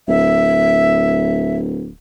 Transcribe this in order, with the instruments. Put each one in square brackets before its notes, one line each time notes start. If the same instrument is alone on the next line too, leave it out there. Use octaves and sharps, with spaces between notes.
[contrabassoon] D1 [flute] E5